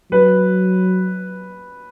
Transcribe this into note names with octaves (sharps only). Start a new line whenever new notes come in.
F#3 B4